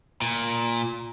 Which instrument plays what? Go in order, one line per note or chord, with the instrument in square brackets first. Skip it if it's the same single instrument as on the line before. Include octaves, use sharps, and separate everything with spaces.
[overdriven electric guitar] A#2